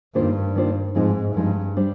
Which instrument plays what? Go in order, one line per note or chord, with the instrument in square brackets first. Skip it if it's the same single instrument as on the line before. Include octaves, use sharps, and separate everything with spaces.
[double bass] G2 [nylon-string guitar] D#3 A#3 D4 F4 C5
[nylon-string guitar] D#3 A#3 D4 F4 C5
[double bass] G#2 [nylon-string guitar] F3 G#3 C4 D#4
[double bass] G2 [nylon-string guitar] F3 G#3 C4 D#4
[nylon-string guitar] G3 D4 G4 C5